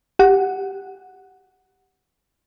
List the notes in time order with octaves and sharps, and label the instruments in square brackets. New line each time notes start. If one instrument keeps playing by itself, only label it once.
[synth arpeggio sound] G4 F#5